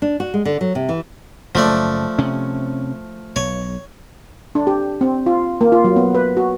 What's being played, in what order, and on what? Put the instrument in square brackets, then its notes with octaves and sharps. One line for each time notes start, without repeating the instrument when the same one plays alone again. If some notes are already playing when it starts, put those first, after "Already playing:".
[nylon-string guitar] D4
F#4
G#3
D3
F#3
C3
E3
[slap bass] F#1 [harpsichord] F3 A3 D5
[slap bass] C3 C#4
[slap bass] B1 [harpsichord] C#5
[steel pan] D4
G4
C4
F4
A#3
F4
F#3
B3
B4
F#4